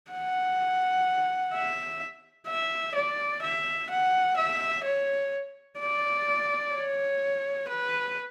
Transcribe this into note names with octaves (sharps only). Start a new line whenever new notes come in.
F#5
E5
E5
D5
E5
F#5
E5
C#5
D5
C#5
B4